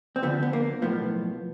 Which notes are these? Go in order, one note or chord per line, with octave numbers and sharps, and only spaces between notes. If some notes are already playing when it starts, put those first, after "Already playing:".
C4
D2 D3 F3 B3
B3
A#3
B1 A2 F3 B3